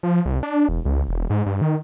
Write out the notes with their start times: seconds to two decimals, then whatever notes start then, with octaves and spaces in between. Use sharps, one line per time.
0.03 F3
0.26 C2
0.43 D4
0.69 E1
0.85 C#2
1.09 E1
1.30 G#2
1.46 G2
1.61 D#3